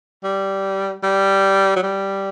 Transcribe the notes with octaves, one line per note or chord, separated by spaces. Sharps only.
G3
G3
F#3
G3